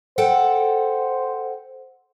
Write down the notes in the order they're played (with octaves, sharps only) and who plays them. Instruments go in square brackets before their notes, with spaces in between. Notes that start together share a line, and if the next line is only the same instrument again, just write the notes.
[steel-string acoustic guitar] A4 F#5 G5 [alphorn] C5